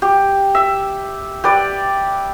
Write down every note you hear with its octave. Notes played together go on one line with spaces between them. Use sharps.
G4
E5
G4 B4 D5